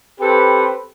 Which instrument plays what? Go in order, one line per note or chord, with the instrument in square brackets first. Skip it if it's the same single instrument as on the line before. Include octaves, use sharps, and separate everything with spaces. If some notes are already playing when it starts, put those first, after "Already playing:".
[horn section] C4 G4 A4 B4